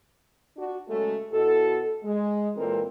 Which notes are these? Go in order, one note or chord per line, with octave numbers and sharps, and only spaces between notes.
D4 F#4
C#3 F#3 G#3 A3
B2 E4 F#4 A4
G#3
A#2 E3 G#3 C4 A4 A#4